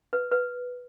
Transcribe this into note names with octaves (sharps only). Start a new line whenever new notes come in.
B4
B4